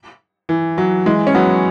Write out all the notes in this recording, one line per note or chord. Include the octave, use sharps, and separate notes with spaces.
E3
F#3
E3 G#3
C#4
F#3 B3